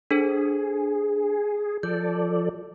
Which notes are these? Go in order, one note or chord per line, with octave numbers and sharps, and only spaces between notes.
D4 G#4 A4 C5
F3 A4 D5 G6